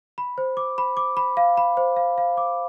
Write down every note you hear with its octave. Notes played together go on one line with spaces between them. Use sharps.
B5
C5
D6
B5
D6
B5
F5
B5
C5
F5
F5
D6